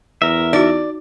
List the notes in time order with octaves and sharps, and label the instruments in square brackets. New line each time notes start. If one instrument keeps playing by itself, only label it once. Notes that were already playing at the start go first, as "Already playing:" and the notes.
[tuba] E2 [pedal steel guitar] A#4 E5
[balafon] D#4 F#4 [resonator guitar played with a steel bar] D5